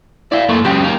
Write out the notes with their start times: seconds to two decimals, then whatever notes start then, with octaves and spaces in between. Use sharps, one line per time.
0.32 E4 D5 E5 F5
0.49 F#2 A3 A#3
0.64 C#2 F#2 C#3 G4 G5
0.83 A#3 D#4